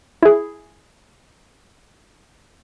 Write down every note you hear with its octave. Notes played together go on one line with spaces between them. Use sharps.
E4 G#4